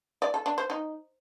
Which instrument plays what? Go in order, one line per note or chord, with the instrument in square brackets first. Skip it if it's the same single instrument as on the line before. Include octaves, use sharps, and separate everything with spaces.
[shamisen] D5
A4
D4
C5
D#4